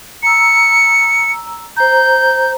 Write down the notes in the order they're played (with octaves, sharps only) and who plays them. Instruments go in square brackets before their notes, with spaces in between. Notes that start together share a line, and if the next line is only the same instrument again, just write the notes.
[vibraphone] A#5 E6 [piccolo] C#7
[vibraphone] C5 A#5 [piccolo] G6